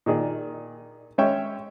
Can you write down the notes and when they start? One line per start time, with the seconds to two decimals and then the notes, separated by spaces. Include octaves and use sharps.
0.06 A#2 D#3 G#4 D5
1.18 G#3 C#4 C#5 E5 G5